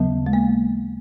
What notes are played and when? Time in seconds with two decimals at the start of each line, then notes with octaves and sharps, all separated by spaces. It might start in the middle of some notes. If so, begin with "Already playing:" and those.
Already playing: D#2 C#3 F#3 B3
0.26 G#3
0.33 A#3